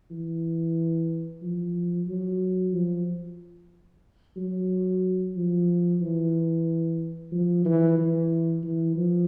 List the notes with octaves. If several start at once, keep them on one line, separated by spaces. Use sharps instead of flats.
E3
F3
F#3
F3
F#3
F3
E3
F3
E3
E3
E3
F3